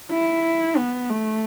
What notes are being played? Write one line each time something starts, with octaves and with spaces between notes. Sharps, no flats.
E4
B3
A3